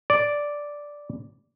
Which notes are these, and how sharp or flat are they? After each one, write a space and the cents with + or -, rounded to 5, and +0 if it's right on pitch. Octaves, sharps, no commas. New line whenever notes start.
D5 -5